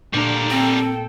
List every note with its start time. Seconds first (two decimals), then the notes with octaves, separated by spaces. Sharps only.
0.13 A#2 G3 A3 D4 A#4
0.51 C4 A4 G5